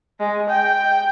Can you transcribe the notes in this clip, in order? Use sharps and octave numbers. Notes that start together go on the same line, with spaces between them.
G#3
G5